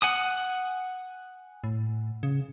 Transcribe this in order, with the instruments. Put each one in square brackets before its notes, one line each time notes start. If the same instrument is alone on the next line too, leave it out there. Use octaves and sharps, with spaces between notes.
[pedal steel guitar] F#5 G#5 D#6
[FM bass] A2
C#3